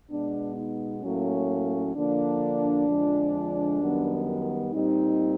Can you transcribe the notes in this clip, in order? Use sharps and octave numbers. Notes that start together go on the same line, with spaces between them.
B2 G#3 B3 D4
D#4
A2 F#3 A#3 C#4
D3 F3 A#3 D4
F2 D3 F3 G#3
F#2 D#3 G3 B3
A#2 G3 C4 D#4